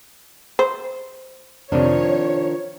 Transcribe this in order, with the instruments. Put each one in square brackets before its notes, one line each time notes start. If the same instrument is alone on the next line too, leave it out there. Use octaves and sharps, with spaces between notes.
[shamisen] C5
[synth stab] F2 C3 [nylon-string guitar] D#3 F3 D4 [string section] C#5